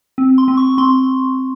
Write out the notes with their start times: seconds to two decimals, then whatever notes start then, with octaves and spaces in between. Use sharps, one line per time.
0.18 C4
0.38 C6
0.48 C4
0.57 C#6
0.78 C4 C6